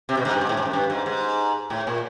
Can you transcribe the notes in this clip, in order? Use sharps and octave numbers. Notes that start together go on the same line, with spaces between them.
C3
B2
G#2
G2
G#2
A2
G#2
F#2
G2
G#2
G#2
A2
A#2